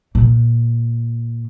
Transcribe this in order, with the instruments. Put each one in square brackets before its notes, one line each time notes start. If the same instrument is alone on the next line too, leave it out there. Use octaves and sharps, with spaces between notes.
[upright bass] A#2